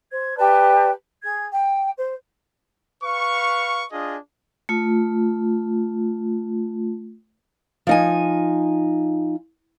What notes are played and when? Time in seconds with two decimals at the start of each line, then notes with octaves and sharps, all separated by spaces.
0.11 C5 G#6
0.37 G4 B4 D5 A5
1.23 G#4 G#6
1.53 G5
1.98 C5
3.03 B4 F5 C#6
3.93 D4 F4 G#4 D#5
4.69 A3 F4
7.87 F3 D#4 G#5